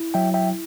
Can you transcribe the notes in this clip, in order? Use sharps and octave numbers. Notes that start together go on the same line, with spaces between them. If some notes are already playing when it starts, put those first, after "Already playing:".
Already playing: E4
F#3 E5 G5
E5 G5